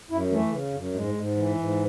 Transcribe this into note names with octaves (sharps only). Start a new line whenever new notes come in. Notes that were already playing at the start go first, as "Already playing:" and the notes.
F#2 E4
E3 A3
C#3
F#2
G#2 G#3
G#2
E3
G#2